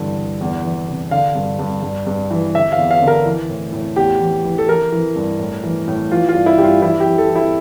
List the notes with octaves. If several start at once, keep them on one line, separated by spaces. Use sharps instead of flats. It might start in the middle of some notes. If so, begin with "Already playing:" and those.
Already playing: G2 D3 E3
D3
E2
E3
C3
D3 F5
G2
G2
G2
G2
E3
D3 E5
F5
E2
F5
D3
A#4
E3
A2
A2
E2 G4
E3
E3
A4
E3 A#4
E3
G2
A2
E3
A2
E3 F4
F4
G2
E4
G2 G4
F4
E3 E4
G4
E3
A4
E3
E4